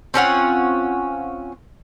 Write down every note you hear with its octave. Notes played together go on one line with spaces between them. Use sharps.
C4 C#4 F4 F#5